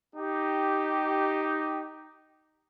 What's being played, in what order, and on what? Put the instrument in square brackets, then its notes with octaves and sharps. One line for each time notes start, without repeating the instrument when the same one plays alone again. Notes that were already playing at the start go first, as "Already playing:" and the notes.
[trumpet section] D#4 G4